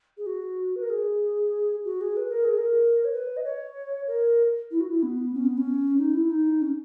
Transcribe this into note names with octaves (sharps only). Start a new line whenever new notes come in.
G#4
F#4
B4
A#4
G#4
F#4
G#4
B4
A#4
G#4
A#4
C#5
B4
D#5
C#5
A#4
E4
F#4
E4
B3
C#4
B3
C#4
D#4
E4
D#4
C#4